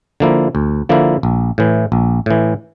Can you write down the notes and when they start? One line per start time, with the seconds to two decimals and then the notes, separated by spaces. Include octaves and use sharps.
0.20 D3 F3 A#3 E4
0.55 D2
0.89 D3 F3 A#3 E4
1.23 A#1
1.58 A2 E3
1.92 A#1
2.26 A2 E3